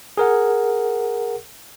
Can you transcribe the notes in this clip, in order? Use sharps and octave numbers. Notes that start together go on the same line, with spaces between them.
G#4 A#4 F#5